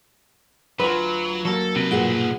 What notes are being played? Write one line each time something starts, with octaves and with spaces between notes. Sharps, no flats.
D2 F#3 F4 B4
F#3 A#3 A4
B1 C3 B4
G2 A#2 G#4 F#5